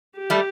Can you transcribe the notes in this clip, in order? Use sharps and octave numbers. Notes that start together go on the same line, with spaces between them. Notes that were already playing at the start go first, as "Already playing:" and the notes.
G4
G3 A3